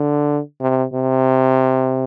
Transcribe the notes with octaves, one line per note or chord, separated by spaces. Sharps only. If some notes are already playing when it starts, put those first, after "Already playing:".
Already playing: D3
C3
C3